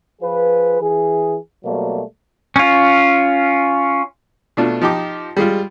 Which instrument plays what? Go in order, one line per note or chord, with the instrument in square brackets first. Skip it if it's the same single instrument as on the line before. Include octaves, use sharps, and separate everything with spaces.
[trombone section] F3 F4 G#4 B4
E3 G#4
B2 F#3 G3 A3 A#3
[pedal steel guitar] C#4 F4
[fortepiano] B2 A3 D4 F4
F3 D#4 G4 D6
G3 G#3 F4